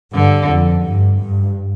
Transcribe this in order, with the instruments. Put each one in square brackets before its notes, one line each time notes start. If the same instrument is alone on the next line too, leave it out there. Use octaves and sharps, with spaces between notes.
[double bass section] G2 [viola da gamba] D3
[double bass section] F2
G2
G2